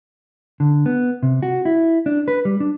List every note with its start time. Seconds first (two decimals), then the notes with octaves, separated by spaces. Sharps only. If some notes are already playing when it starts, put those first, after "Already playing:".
0.60 D3
0.86 B3
1.23 C3
1.43 F#4
1.65 E4
2.06 D4
2.28 B4
2.45 G3
2.60 D4